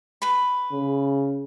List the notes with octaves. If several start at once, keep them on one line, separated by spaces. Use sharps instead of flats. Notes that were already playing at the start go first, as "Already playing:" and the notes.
B4 B5
C#3